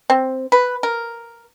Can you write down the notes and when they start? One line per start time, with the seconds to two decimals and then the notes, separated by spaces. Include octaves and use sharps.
0.10 C4
0.52 B4
0.83 A#4